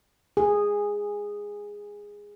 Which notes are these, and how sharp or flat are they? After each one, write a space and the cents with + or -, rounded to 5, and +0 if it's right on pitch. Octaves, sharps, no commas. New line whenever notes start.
G#4 -10